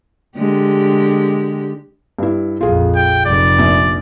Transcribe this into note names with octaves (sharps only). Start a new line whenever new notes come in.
D3 G#3 G4
G2 E4
A#1 F2 F4 G#4
G5
F1 D5
A#1